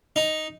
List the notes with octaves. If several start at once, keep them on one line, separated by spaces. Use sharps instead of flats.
D#4